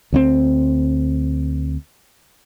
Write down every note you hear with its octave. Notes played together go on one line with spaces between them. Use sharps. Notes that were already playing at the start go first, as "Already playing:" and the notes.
D2 G#3 C4